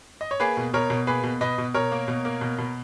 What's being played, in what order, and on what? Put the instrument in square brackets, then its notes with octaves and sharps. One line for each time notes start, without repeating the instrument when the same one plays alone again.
[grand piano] D#5
C#5
A#3 G#4 B4
B2
B2 A#4 C#5
B2
A#3 G#4 B4
B2
B2 B4 D#5
B2
B2 A#4 C#5
A#3
B2
A#3
B2
B2